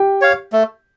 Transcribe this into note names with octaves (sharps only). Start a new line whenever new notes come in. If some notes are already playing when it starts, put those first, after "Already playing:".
Already playing: G4 G5
C#5 F5
A3